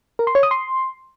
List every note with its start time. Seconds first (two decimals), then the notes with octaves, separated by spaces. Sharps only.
0.19 A#4
0.27 C6
0.35 C#5
0.43 D#6
0.51 C6